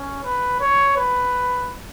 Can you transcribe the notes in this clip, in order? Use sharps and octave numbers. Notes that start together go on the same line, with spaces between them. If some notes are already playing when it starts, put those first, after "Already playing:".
Already playing: C#4
B4
C#5
B4